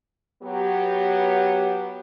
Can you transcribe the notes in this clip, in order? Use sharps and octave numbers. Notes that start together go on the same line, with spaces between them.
F#3 B3 G4